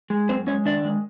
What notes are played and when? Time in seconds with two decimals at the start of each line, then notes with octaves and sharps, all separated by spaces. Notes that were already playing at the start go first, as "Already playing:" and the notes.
0.10 G#3
0.29 F#2 C4 C5
0.47 G#3 C#4 C#5
0.65 D#3 D4 D5
0.85 G#3